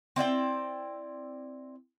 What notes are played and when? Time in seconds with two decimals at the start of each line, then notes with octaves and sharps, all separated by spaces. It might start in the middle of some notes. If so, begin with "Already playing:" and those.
0.16 C4 E4 D5 G5